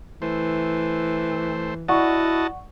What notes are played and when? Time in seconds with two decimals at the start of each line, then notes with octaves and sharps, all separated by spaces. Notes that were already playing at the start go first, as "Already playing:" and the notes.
0.22 E3 A3 C5
1.88 E4 F#4 D5 D#5 F#5 A5 C#6